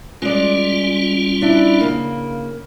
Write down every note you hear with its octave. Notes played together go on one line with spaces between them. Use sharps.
G3 G#3 C#4 F4 D5
D4 E4
C#3 A#3